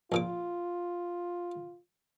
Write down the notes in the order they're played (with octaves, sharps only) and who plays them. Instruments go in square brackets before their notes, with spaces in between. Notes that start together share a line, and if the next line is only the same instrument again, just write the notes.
[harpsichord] A#1 A#2 D6 [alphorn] F4